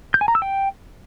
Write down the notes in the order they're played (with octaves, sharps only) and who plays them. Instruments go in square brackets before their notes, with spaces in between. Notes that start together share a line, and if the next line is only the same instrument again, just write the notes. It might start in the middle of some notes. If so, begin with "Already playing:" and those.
[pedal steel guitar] G6
G#5
A#5
E6
G5